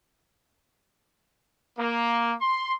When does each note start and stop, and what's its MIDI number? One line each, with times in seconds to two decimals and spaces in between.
1.78 2.34 58
2.41 2.75 84